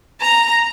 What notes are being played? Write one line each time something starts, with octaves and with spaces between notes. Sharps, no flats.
A#5